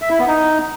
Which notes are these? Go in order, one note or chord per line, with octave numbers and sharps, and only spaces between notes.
E5
E4
B3
D#4